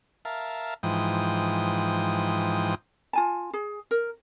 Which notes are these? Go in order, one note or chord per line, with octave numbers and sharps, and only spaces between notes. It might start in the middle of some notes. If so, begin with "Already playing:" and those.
A#4 E5 F5 A5
G#2 E3 F3 G5 D#6
F4 G#5 A5
G#4
A#4